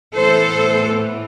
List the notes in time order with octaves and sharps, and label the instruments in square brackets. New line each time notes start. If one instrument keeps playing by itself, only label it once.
[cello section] A2 E3 B3 A4 C5